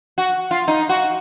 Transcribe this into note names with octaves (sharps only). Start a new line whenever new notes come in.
F#4
F4
D#4
F#4